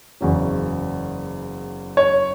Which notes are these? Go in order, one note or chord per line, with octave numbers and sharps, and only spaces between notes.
F#1 E2 C#3 F#3
C#5